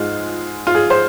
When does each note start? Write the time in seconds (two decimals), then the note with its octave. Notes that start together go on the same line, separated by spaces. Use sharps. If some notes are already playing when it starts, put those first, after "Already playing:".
Already playing: G#2 G#3 D#4 F4
0.67 F4
0.75 G#4
0.90 C5